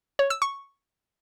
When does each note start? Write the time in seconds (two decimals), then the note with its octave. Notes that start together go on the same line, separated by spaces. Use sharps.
0.19 C#5
0.30 E6
0.42 C#6